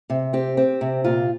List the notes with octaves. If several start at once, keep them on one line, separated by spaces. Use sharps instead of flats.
C3
C4 G4
C4
C3
A#2 F4